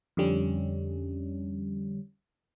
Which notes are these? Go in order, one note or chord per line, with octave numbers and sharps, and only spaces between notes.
F2 D3 G3 C#4